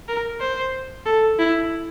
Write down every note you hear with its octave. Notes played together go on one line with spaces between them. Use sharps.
A#4
C5
A4
E4